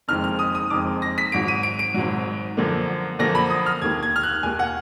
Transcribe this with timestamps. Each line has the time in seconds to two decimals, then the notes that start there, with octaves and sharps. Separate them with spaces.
0.08 F#1 F2 D#3 G#3 F6
0.24 F6
0.39 D#6
0.55 D#6
0.70 F#1 F2 D#3 G#3 D6
1.02 A#6
1.18 B6
1.32 G#1 G#2 F#3 D7
1.48 D#7
1.63 D7
1.79 D7
1.94 G#1 G#2 F#3
2.57 F#2 D3 F3 A#3
3.19 F#2 D3 F3 A#3 A#6
3.35 B5
3.50 D#6
3.66 F6
3.82 D#2 D#3 A#3 G#6
4.03 G#6
4.16 F6
4.23 F#6
4.43 D#2 D#3 A#3 G#5
4.59 F#5